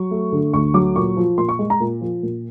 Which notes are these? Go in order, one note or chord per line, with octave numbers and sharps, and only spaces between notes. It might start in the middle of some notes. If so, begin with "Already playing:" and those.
Already playing: F#3 C#6
A3
D3
D2 C#6
F#3 D6
A#2 C#6
F3
A#2 C6
C#6
G#3
A#5
A#2
F3
A#2